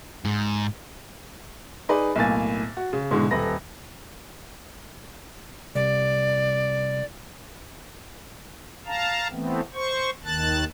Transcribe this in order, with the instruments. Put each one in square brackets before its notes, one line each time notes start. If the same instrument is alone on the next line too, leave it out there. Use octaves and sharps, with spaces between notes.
[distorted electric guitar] G#2
[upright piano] D#4 G#4 B4 D5
B1 A2 A#3 G#5 A6
F#4
C#3
G#2 B2 D3 E3 G#3
D#1 A4 B4 A#6
[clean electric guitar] C2 [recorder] D5
[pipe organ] F5 A5 A#5
E3 A3 B3 C4
C5 C#6
D#2 D#3 A5 F#6 A6